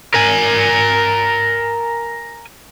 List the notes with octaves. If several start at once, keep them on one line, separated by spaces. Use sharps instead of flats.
A#4 G#5